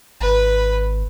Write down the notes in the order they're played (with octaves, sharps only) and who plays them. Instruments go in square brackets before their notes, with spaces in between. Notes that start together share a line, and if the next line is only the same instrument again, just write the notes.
[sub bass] G#1 [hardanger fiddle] B4